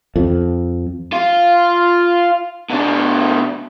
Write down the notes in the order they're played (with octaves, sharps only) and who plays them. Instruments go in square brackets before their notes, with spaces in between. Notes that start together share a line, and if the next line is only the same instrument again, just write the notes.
[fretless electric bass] F2
[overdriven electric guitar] F4
B2 D4